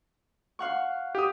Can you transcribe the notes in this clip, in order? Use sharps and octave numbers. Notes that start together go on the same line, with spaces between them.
F5 F#5 C#6
G4 D#6